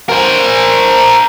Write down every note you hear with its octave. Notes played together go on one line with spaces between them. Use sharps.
A#4 C5